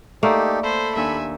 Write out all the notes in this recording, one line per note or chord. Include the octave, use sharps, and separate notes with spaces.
A3 A#3 D#4 G4 A4 D5
A4 C5 B5
D#2 D4 E5 G#5 C6